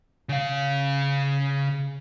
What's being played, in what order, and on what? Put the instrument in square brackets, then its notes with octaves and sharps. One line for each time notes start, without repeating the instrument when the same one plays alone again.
[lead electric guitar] C#3 F5